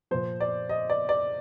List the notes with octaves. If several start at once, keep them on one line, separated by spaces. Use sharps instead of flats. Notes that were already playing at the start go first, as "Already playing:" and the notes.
A#2 F3 C5
D5
D#5
D5
D5